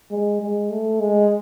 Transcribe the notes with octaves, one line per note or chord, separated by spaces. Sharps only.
G#3
G#3
A3
G#3